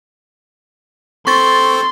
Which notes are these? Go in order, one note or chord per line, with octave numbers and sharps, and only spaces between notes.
C4 A4 C5 C6 C#6 A6